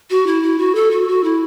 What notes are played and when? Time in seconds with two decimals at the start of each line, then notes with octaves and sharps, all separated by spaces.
0.10 F#4
0.27 E4
0.43 E4
0.59 F#4
0.75 A4
0.91 F#4
1.08 F#4
1.24 E4